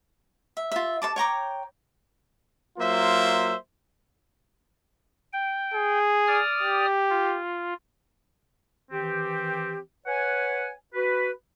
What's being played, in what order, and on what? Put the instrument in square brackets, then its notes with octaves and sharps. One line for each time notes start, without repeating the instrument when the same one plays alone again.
[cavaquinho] E5
F4 E5
A4 C#5 A5 D6
C#5 G5 A#5 D6
[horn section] F#3 A#3 F4 C5 E5
[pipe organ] G5
[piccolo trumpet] G#4
[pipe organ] D5 D#6 F6
[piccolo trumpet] G4
[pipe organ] F4
[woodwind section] D#3 E3 C4 G4
B4 C#5 F#5 G#5
F#4 B4